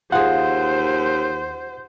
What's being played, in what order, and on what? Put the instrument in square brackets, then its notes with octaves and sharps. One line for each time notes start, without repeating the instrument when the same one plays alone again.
[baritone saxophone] D#2 [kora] F4 G#4 [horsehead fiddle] C5 [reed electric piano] F#5